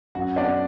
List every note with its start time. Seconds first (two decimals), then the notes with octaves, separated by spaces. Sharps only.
0.15 F#2 F#4 F#5
0.36 B3 D4 D5